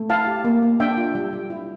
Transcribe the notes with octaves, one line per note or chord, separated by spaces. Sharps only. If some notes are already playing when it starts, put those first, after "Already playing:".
Already playing: A3
E4 F5 A5
G4
A#3
A#3
D4 E5 G5
F4
G3
G3
E4